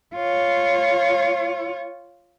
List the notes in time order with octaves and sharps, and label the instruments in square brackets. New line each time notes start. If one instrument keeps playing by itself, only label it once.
[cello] F4 C#5